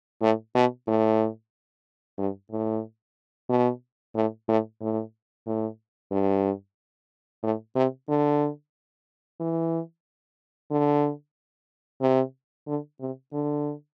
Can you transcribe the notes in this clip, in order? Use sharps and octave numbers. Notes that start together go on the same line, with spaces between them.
A2
B2
A2
G2
A2
B2
A2
A2
A2
A2
G2
A2
C3
D3
E3
D3
C3
D3
C3
D3